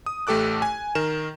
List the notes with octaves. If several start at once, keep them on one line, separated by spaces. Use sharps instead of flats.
D#6
A1 A3 G4 A4 D6 F#6
G#5
D#3 A#4 E7